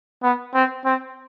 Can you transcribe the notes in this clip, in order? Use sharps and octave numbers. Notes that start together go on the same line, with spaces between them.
B3
C4
C4